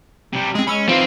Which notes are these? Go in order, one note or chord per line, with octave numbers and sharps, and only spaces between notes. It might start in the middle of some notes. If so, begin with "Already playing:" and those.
C3 G3
G#3 C4 G#4
G#3 C#4 B5 E6
E3 C4 D#4 F4